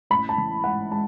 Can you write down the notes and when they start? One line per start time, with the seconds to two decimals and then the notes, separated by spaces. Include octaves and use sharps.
0.10 A1 B5
0.29 A5
0.38 E3
0.64 G#2 F#5
0.91 G#3 A5